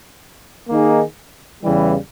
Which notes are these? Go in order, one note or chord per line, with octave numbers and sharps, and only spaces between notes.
D#3 A#3 D#4 G#4
E2 C#3 E3 G3